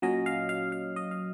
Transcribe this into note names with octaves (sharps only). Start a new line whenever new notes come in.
A#2 F#3 C#4 D#5
F5
F5
F5
D#5
F5